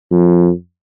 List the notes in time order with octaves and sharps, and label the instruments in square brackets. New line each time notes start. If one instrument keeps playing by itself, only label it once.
[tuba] F2